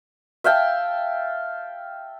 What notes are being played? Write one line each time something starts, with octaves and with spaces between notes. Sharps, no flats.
E5 F5 G5 A5